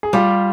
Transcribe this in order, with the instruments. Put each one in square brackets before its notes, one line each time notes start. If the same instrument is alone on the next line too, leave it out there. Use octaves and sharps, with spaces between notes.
[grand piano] G#4
[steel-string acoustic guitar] G3 [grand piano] F4 G4